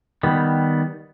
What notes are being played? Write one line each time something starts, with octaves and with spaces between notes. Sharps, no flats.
D#3 G3 B3